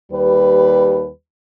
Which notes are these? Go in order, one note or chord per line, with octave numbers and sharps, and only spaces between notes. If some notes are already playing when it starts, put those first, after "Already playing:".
D#2 G3 B4